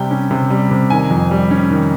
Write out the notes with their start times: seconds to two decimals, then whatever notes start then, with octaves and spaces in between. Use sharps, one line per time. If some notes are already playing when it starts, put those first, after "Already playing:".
Already playing: C3 G3 G5
0.11 C#4
0.31 C3
0.50 G3
0.71 C3
0.90 D#3 G#5
1.11 F2
1.31 G3
1.51 C#4
1.71 D#3